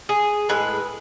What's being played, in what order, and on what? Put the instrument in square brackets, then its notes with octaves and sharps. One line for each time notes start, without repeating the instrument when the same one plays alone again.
[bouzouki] G#4
A2 G#3 B4